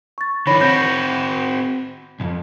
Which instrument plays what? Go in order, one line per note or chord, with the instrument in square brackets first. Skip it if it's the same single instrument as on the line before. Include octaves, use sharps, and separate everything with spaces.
[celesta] C#6 A6
[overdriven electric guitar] D3 E3 [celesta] C#5 B5 A#6
[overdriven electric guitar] C4 F#4 [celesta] B5 G6 A#6
[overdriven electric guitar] B1 F2